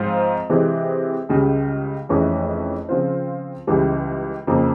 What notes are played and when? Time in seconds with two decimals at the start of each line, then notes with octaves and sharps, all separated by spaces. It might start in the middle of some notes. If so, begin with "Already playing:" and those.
Already playing: G#2 F3 C4 F4 C5
0.50 C3 E3 G#3 C4
1.29 C#2 C#3 G3
2.09 F1 F2 E3 G#3 C#4
2.89 C#3 F3 C4 F4 C5
3.67 C#2 C#3 E3 G3
4.47 F2 C#3 F3 A#3